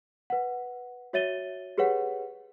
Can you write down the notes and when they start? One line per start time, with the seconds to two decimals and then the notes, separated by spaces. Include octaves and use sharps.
0.30 B4 F#5
1.13 F#4 C#5 E5 A6 D#7 G7
1.78 G4 G#4 B4 C#5 F#5